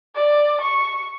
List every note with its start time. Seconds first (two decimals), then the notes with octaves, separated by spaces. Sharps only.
0.16 D5
0.62 C#6